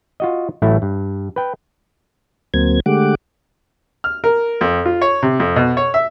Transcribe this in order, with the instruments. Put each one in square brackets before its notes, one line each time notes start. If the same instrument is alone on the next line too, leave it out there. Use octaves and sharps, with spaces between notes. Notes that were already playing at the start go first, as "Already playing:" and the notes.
[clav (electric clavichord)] F4 F#4 D#5
A1 A2 F#3 A3 E4
G2
B4 G5
[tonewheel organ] D2 F#3 A#3 C4 G#6
D3 G#3 A3 G4 F#5 D6
[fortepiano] F6
A#4
F2
F4
C#5
C3
F2
B2
C#5
E5